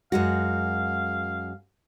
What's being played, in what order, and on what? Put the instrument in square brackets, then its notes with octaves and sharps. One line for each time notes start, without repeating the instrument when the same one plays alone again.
[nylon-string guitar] F#2 G#3 F#4 [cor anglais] F5